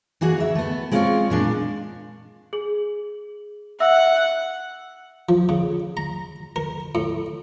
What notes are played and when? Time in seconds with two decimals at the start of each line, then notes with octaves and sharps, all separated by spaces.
0.21 E3 A#3 F#4 G#4
0.38 D2 E5
0.55 A3 B3
0.91 G#3 C4 F4 C5 C#5 F5
1.30 A#2 G#3 D4
2.53 G#4 F#7
3.80 E5 F#5 E6
5.29 F3
5.49 C#3
5.97 A#5
6.56 A#4
6.95 A2